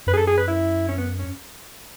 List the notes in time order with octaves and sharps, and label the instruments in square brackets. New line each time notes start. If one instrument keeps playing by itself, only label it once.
[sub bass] F#2 [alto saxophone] B4
[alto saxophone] G#4
A4
G#4
B4
E4
C#4
B3
C#4